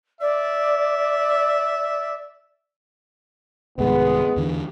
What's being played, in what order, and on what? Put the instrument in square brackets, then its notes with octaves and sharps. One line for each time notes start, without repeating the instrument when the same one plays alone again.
[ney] D5 [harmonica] E5
[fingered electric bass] C2 G#2 D#3 [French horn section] G#3 B3
[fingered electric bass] E2 D3 E3